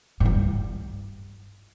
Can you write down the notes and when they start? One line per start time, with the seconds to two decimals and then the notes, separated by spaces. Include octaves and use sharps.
0.20 A2
0.25 G2